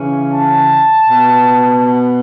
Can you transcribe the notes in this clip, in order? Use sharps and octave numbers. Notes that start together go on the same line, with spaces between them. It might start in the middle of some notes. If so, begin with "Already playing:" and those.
Already playing: C#3 E3 C#4
A5
B2 B3